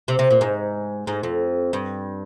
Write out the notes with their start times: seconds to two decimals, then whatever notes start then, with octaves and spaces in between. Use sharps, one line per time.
0.08 C3
0.19 C3
0.30 A#2
0.41 G#2
1.07 G#2
1.23 F2
1.73 G2